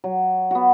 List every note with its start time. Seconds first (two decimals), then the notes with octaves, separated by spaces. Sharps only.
0.04 F#3
0.51 B3 F#4